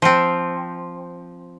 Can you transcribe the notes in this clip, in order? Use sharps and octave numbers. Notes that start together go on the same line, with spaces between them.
F3 C4